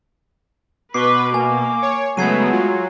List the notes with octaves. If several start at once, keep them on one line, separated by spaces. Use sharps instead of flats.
B2 B4 C#6 D6 C7
A#3 G#5
C#5
C#3 F#3 G#3 A3 B3 G#6 C7 D#7
F#3 F4